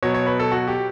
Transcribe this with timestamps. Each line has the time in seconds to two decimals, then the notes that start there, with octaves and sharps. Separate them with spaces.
0.03 B2 F#3 C#5
0.14 C#5
0.26 B4
0.40 A4
0.52 F#4
0.68 G4